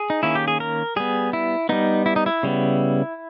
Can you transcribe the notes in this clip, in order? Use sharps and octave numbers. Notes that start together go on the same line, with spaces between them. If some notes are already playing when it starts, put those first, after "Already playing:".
Already playing: G#4
D#4
D#3 A#3 C#4 E4
G4
G#4
A#4
G3 B3 G#4
E4
G3 B3 D#4
E4
D#4
E4
C#3 G3 B3